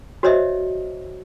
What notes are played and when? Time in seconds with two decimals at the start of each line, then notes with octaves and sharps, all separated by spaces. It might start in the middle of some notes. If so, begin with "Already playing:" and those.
0.23 F#4 C5 C#5 D#5 E5